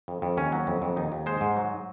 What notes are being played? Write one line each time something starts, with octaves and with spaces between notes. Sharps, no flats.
F2
F2
D#2 C#4
F#3
F2
F2
D#2 D#4
D#2
G#3 C5
G#2
F#3